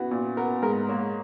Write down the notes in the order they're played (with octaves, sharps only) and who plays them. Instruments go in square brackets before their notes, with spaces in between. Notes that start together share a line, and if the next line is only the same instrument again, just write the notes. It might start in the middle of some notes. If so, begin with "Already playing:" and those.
Already playing: [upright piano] B3 [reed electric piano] C#4 E4 F#4
[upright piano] A#2
[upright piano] B3 [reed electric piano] A#4
[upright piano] G#2 [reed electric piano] A#4
[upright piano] A#3 [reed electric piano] C#5